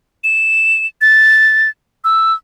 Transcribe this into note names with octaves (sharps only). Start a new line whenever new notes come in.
E7
A6
E6